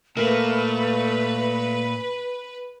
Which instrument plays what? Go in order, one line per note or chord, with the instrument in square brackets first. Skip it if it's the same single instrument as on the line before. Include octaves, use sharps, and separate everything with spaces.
[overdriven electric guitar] A#2 [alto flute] A3 [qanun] A#4 E5 [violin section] B4